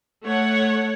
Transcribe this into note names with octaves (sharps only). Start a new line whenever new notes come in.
A3 C#5 F#5